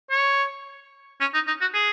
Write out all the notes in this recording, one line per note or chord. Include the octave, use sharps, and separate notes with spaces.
C#5
C#4
D#4
D#4
F#4
G#4